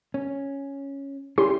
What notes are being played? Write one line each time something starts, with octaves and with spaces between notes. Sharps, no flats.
C#4
G3 C#4 E4 G4 G#4 C6